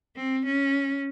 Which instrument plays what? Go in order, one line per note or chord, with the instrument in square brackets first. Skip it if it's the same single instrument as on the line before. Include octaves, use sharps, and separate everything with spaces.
[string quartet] C4
C#4